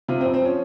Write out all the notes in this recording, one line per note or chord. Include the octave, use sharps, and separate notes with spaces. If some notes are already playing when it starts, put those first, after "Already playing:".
C3 F4
C4
F2
C4
F3 C#4